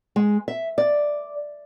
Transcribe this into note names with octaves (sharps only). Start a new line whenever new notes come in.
G#3
E5
D5